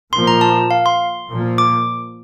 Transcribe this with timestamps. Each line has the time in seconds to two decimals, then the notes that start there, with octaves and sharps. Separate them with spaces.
0.12 A#2 F3 A#3 C6
0.27 A#5
0.41 A5
0.71 F5
0.86 C6
1.29 A#2 F3 A#3
1.58 D6